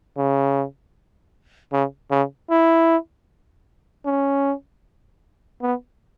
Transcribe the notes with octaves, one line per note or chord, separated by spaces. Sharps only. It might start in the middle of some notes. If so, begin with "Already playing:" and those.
C#3
C#3
C#3
E4
C#4
B3